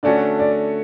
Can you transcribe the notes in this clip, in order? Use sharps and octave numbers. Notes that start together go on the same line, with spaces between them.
D3 A3 C#4 F#4 D5
D5